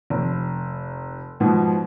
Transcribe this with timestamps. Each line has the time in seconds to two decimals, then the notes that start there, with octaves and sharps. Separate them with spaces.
0.10 F1
1.40 G#2 B2 F3